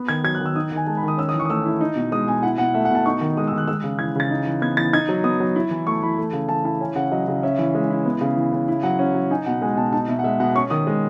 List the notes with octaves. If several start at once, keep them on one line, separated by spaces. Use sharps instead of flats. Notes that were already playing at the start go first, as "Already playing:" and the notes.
Already playing: B3
D#3 G#6
F#3 G#6
F#6
D#3
E6
D#4 D#6
D#3 G#5
G#3 A5
B5
D#3 D#6
C#4 E6
D#6
E3
C#6
D#6
A3 E6
E4
D#4
B2
G#3 D#6
B2 G#5
E4 F#5
B2 F#5
A3 E5
F#5
B2 A5
D#4 C#6
D#3
G#3 D#6
E6
D#3
F#6
G#3 E6
C#3
E3 G#6
C#3 A6
D#4
E3
B3 G#6
E3 A6
D#4 G#6
F#3
B3 D#6
F#3
E4
E3
A3 C#6
E3 B5
A3
C#3
E3 A5
E4 A5
C#4 G#5
C#3 F#5
F#3 D#5
C#3
C#4 E5
E3
G#3
E4
B3
C#3
E3
C#3
E4
F#3 F#5
C#4
F#3
D#4 G#5
B2 F#5
G#3 G#5
B2 A5
D#4 A5
B2 E5
F#5
G#3 E5
B2 F#5
C#4 C#6
D#3 D#6
G#3